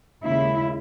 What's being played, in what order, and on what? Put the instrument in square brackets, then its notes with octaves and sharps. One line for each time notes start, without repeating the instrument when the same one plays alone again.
[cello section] D#2 C#3 G#3 E4